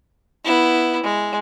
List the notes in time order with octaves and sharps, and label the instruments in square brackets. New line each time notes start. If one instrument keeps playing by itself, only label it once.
[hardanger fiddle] B3 E4
G#3